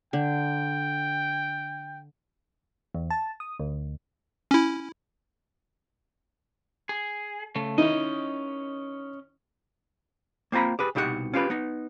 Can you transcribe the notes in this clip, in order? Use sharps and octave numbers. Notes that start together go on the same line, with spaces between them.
D3 G5
E2
A5
D#6
D2
C#4 E4
G#4
C#3 A3
D#3 C#4 D#4 E4 D#5
A#3 C4 F4 A#5 B5
G4 G#4 B4
C2 B2 D#4 G4 G#4 F#5
C#4 F4 G4 B4
B3 D#4